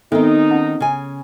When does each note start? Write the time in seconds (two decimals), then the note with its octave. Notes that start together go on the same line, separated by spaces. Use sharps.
0.12 D#3 B3 C4 D#4 A4 E5
0.50 C#4 F#5
0.80 C#3 G#5